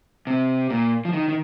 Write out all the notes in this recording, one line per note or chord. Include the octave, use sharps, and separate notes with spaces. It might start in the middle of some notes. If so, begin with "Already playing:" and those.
C3
A#2
F3
D#3
D#3